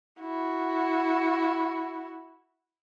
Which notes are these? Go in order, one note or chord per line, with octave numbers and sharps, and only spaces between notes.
E4 F#4